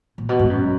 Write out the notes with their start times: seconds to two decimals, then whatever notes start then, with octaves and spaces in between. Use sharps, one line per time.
0.18 A#2
0.29 B2
0.39 G#2
0.50 F#2